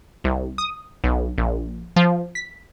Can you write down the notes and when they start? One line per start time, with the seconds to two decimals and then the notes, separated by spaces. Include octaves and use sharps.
0.24 C2
0.58 D#6
1.04 B1
1.38 A#1
1.96 F3
2.35 B6